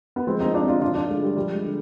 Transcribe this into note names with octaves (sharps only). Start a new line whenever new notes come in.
B3
F3 G#3 C4
C4 D#4
G1 D4 F4
D4 F4
F3 D4 F4
D4 F4
D3 G#3
G3
F3 G3
G#3
D3